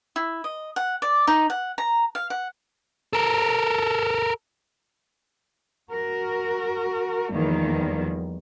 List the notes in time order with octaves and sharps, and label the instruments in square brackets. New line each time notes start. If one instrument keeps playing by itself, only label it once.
[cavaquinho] E4
D#5
F#5
D5
D#4
F#5
A#5
F5
F#5
[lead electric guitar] A4 A#4
[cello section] F#4 A#4
E2 D#3 F3 G3 A#3